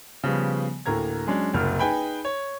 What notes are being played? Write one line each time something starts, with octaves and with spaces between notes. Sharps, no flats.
C#3 F3 G3 B3
D2 A2 A#3 A#5 G#6
F#3 G#3 C#4 D4
F#1 C2 A#4 F6
D#4 G#4 B4 G5 G#5 B5
C#5